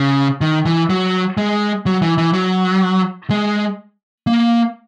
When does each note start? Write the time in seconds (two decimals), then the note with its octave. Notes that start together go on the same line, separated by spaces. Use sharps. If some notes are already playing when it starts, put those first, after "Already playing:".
Already playing: C#3
0.41 D#3
0.66 E3
0.90 F#3
1.37 G#3
1.86 F#3
2.02 E3
2.18 E3
2.33 F#3
3.30 G#3
4.27 A#3